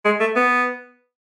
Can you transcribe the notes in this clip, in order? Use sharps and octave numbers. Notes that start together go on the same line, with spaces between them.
G#3
A3
B3